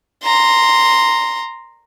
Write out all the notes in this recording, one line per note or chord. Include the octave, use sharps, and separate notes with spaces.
A#5 C6